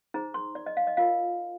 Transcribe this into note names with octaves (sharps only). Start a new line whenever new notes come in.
D#4 G#4 C5 A#5
C6
D5
D#5
F5
D#5
F4 A#4 F5